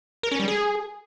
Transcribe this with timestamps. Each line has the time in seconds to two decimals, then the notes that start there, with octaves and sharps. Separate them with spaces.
0.23 A#4
0.32 C#4
0.40 G3
0.48 G#4